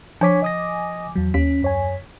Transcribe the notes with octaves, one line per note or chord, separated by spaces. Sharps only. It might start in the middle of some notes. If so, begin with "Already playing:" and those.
F3 D4 C#5 G#5 D6 B6
D#5 D#6 A#6
E2 F#3
D#2 C#4 B6
F#2 C#5 G#5